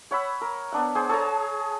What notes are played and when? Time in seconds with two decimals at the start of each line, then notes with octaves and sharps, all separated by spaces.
0.11 C#5 F#5 B5 E6
0.41 A#4
0.72 B3 D4 F#5
0.95 G#4 C5 F#5 D6
1.09 G#4 C#5 A5 A#5